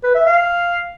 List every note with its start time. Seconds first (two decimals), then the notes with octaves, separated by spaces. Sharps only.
0.04 B4
0.15 E5
0.26 F5